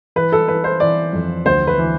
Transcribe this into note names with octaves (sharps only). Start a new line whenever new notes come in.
E3 B4
A4
E3 B4
C5
E3 D5
F2
D2 C5
B4
E3